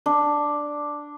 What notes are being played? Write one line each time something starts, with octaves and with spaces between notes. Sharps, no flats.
D4